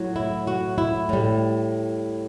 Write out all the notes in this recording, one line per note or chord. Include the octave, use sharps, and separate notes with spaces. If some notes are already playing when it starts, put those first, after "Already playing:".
Already playing: A2 F#3
E4
F#4
E4
A2 G3